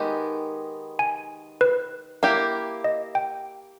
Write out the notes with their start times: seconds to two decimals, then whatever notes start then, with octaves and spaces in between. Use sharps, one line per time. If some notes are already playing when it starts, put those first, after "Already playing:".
Already playing: D#3 G#3 B3 D#4 G4
0.99 G#5
1.61 B4
2.23 A#3 E4 G4
2.84 D#5
3.15 G5